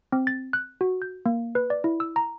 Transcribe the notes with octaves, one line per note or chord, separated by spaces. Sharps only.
C4
A6
F#6
F#4
G6
A#3
B4
D5
E4
E6
A#5